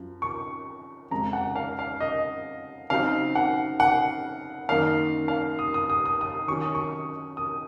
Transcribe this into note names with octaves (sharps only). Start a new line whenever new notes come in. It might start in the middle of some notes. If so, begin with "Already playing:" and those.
Already playing: F#2 F3
C#6
F2 C#3 G#3 A#5
F#5
F5
F5
D#5
C#3 F#3 C4 D#4 F5
F#5
F#5
F#2 D#3 A#3 D#4 F5
F5
D#6
D#6
D#6
D#6
D#6
D#3 F#3 C#4 C#6
D#6
C#6
D#6